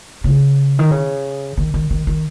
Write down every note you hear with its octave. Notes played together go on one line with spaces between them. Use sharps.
C#3
D#3
C#3
D#3
D#3
D#3
D#3